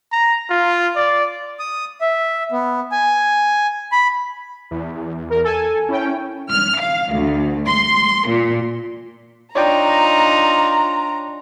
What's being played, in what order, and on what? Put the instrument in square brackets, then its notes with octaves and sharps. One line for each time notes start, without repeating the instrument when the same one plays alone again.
[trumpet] A#5
F4
D5
[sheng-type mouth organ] D#6
E5
B3
G#5
B5
[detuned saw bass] E2
[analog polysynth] A#4
A4 G#5
[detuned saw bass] C#4 [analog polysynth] E4 G5
[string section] F6
F5
D2
C6
A#2
[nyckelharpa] D4 F4 [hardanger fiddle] D#4 [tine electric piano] C#5 D5 G5 [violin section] A#5